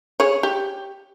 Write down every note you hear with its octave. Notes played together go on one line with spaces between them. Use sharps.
G#4 C#5
G4